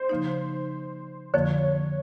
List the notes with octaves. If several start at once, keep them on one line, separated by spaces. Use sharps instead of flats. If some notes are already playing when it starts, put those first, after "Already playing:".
Already playing: C5
C#3 F3 A#3 D#4
F2 D3 F3 A#3 C#5